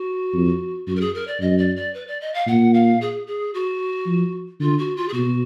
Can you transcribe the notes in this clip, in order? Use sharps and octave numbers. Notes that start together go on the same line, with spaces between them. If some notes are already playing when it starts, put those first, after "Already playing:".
Already playing: F#4
F2
F#2 F#4
A#4
G#4
A#4
D5
F#2 D#5
D5
D5
B4
D5
D#5
F5
A#2 F#5
F5
G#4
G#4
F#4
F3
D3 F4
F#4
F4
G#4
B2 F#4